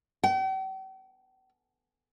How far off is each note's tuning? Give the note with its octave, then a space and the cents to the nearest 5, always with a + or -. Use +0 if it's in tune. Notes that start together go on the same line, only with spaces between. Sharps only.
G5 -45